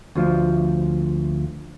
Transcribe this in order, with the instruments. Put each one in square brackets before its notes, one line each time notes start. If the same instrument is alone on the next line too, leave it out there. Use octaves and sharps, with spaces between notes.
[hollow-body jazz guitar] D2 F3